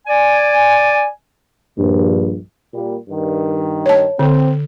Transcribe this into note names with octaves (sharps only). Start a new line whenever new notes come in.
D5 G#5
A#1 G2
A#2 G3
G2 D#3
C#5 A5
D3 C4